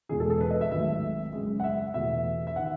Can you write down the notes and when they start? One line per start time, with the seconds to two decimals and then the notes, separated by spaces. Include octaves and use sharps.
0.09 E2 B2 G#3 G#4
0.20 A4
0.30 A4
0.41 B4
0.50 D#5
0.61 E5
0.71 G#1 G#2 F#3 A3 E5
1.33 F#2 C#3 G#3
1.60 F#5
1.64 E5
1.94 E2 B2 A3 E5
2.47 E5
2.56 D#3 F#5